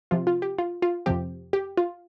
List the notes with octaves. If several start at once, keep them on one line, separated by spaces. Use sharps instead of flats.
C3 F3 C4 F4
F4
G4
F4
F4
F2 C3 F3 C4 G4
G4
F4